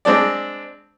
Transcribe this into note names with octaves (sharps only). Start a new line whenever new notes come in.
G#3 C4 D4 D5